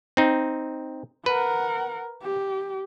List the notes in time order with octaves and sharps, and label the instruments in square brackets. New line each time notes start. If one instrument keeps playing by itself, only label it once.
[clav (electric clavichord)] C4 D#4
[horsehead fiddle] A#4 F#5 [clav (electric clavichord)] B4
[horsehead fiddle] G4